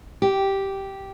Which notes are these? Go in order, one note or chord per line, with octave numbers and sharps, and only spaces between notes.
G4